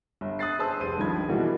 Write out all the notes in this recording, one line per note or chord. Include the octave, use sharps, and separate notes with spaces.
G1
D#6 F#6 A6 C7
G#4 B4 C5 A5 D#6 E6
F1 C5 D#7
C#2 G2 D#3 F3 B5 G#6
B2 E3 G3 A#3 F#4